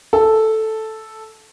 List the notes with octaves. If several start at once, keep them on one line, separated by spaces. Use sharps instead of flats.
A4